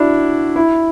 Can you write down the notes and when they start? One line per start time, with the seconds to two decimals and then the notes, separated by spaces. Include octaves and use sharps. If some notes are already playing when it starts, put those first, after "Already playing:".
Already playing: D4 E4 F#4
0.56 E4